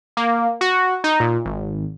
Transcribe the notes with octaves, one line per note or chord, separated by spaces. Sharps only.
A#3
F#4
D#4
A#2
G#1